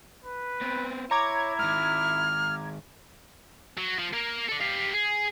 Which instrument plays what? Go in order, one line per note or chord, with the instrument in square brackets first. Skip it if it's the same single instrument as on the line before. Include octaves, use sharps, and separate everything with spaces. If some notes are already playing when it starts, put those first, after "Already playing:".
[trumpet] B4
[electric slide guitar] B3 C4
[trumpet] E4 [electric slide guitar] C#5 [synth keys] A#5 D6 G#6
[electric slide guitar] G#2 D#3 [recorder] F6
[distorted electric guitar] F#3
F3
A#3 A#4
A4 D5
G4 F5
G#4